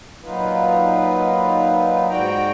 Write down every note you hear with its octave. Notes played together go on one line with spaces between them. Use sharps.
A#2 F#3 D#4 F4 B4
G#2 F#4 D5 G5 A#5